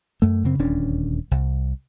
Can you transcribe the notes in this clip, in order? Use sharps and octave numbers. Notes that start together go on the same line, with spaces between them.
F#2 A3
F#2 C#3 C4
D#1 D2 C#4 D4
C2